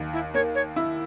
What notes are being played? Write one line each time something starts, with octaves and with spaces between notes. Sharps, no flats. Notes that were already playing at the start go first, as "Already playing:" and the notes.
Already playing: D#2
E4
A#3 C#5
C#5
E4